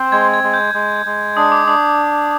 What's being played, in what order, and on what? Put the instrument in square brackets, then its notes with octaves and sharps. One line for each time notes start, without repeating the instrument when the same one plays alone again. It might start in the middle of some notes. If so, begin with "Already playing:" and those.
Already playing: [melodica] C4 C5
[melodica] G#3 [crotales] G#6
[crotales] G#6
[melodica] G#3
[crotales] G6
[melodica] G#3
G#3
[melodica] D4 [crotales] D#6
[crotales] D6
[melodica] D4 [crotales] D#6